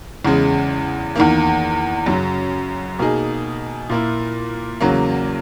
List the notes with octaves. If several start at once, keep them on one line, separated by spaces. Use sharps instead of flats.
E2 C#3 G#3
E2 D#3 A#3
F#2 C#3 F#3
B2 A#3 D#4 G#4
A#2 A#3 E4
E2 C#3 F#3 A#3